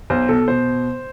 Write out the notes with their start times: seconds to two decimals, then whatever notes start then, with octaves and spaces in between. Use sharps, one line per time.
0.10 B1 C5
0.29 B2 A4
0.48 B2 C5